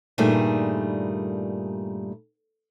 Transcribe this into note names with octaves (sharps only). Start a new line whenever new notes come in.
G2 A#2 D#3 G3 A3 G#4